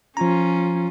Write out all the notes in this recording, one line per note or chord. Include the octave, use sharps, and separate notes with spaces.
F3 C#4 F4 A#5